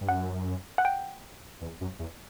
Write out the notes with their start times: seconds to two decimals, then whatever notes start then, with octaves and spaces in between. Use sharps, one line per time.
0.01 G2
0.09 F#2 F#5
0.78 F#5
0.85 G5
1.61 E2
1.81 F#2
1.99 E2